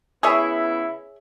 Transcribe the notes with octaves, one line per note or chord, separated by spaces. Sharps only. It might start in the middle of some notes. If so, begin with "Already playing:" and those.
C#3 B3 E4 G#4 C#5 E5